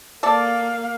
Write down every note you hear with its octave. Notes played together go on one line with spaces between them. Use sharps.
A#3 A4 D5 F5